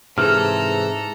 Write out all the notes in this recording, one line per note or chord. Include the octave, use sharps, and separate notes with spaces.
G#2 C3 E3 G#4 A4 A#5 F6